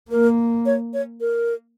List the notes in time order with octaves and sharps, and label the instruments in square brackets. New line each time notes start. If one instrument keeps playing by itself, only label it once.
[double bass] A#3 [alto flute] A#4
[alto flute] C#5
C#5
A#4